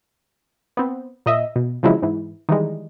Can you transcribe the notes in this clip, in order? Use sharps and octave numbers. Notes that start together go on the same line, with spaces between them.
B3 C4
A#2 D#5 E5
B2
C#3 F3 F#3 G#3 E4
G#2 E3
D#3 E3 G3 G#3